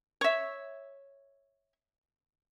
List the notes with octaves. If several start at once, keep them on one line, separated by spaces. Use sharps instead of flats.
C#5 E5